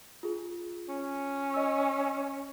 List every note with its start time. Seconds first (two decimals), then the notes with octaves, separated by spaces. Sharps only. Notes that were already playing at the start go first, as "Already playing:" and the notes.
0.23 F4 G#4
0.89 C#4
1.54 D#5 E6